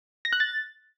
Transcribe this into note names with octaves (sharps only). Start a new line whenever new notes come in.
A#6
F#6
A6